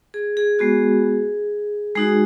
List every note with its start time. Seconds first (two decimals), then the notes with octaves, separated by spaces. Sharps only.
0.14 G#4
0.37 G#4
0.59 G#3 B3 F#4 G#4
1.95 G#3 D#4 F#4 G#4